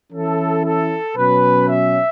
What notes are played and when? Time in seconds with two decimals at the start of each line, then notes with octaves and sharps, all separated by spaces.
0.13 E3 C#4 E4 A4
0.64 A4
1.16 B2 F#3 C#4 B4
1.68 E5